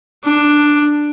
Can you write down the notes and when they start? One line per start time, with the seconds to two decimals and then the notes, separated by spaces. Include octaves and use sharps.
0.24 D4